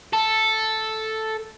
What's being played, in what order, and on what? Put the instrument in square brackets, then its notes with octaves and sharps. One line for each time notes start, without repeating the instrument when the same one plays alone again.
[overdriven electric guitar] A4